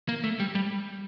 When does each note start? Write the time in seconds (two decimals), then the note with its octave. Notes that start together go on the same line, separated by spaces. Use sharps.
0.09 A#3
0.24 A3
0.40 G3
0.55 G3